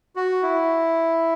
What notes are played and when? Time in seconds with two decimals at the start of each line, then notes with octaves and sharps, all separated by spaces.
0.16 F#4
0.43 E4